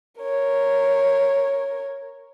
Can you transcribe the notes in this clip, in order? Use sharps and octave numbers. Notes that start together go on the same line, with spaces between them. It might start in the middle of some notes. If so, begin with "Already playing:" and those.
A#4 C#5